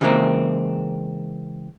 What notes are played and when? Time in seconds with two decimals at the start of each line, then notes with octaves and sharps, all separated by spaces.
0.01 C#3 E3 G3 G#3 A#3 C4